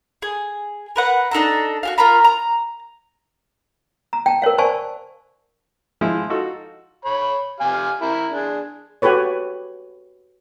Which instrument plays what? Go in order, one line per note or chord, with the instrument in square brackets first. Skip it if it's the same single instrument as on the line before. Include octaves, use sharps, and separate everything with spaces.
[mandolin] G#4
A#4 B4 F#5
D4 D#4 A4 A#5
F#4 G4 F5
F4 A#4 A#5 B5
A#5
[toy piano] A#5
G5 A5
A#4 C5 C#5 F5
C5 D5 F5 G#5 A5 C#6
[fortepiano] F3 G#3 E4
D#4 F4 F#4 A4
[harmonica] C#5 B5
G4 F5 G#5
E4 A#4
D4 G#4
[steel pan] F#4 G4 A4 B4 C#5